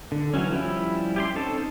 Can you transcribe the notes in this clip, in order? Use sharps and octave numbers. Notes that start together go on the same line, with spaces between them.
D3
E3 F#3 C#4
F3 G3 C#4 E4
G4 C#5 C6
C4 C#4 D#4 A4 A5